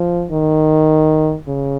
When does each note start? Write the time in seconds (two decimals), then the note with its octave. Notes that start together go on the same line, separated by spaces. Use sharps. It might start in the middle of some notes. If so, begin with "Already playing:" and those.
Already playing: F3
0.31 D#3
1.48 C#3